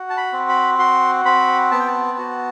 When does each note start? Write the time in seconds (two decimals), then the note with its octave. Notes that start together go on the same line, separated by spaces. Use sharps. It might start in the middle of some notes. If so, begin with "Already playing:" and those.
Already playing: F#4
0.10 A5
0.17 B5
0.33 C4
0.49 B5
0.79 F#4 C6
1.25 C4 B5
1.71 B3 A5
1.80 G5
1.87 A5
2.18 F#4